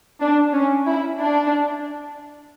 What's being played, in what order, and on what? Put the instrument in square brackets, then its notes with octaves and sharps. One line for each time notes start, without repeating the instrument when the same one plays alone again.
[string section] D4
C#4
E4
D4